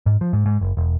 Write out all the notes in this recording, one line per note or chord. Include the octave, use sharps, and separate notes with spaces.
G#2
F3
G#2
G#2
F#1
E1